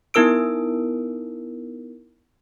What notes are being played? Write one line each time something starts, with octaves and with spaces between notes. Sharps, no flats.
B3 D#4 E4 A#4 E6 D7